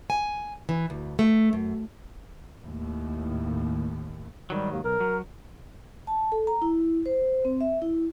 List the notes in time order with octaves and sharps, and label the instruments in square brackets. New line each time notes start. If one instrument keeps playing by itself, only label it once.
[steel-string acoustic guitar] G#5
E3
D2
A3
F#2
[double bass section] D#2 A2
[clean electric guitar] G#2 D#3 F#3 [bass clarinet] G3
[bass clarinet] D#2
[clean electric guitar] B1 [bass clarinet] A#4
[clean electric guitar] F#3
[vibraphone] A5
A4
A#5
E4
C5
C4
E5
E4